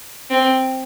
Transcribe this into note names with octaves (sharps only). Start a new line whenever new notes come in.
C4